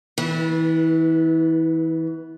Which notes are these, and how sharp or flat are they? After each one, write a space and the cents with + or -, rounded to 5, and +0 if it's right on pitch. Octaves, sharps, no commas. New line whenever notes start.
E3 -30 B3 +0